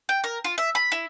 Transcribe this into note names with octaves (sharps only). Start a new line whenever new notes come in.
G5
A#4
F4
E5
B5
E4